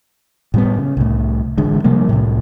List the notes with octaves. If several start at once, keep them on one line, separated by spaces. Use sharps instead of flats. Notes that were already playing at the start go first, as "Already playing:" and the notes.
A2 G3 B3
C#3
C2 A2
A1 D3 G#3
C3 F3 G3 A#3
C2 A2